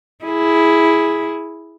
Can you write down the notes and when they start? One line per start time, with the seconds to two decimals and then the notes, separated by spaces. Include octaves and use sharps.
0.24 E4 G#4